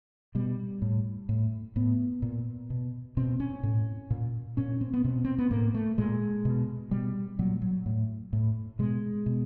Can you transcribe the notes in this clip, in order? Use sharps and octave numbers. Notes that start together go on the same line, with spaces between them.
B2 G3
A2
A2
A2 B3
A#2
B2
B2 C4
C#4
A2
A#2
A#2 C#4
C4
B3
B2 C4
C4
B3
A2 A#3
A3
A#2 G#3
B2
B2 G3
A#2 F#3
F#3
A2
A2
B2 G#3
B2